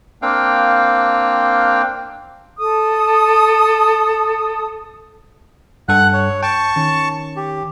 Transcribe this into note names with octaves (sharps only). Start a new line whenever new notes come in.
A#3 C4 D4 F5 G5
A4 D#6
G2 A4 F#5 F#6
C#5
G5 A5 C#6
D#3 C#4
G4